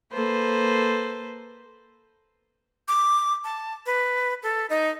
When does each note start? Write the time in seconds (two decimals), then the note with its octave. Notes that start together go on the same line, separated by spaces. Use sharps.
0.13 A#3 A4 B4 C5
2.88 D6
3.44 A5
3.86 B4
4.43 A4
4.70 D#4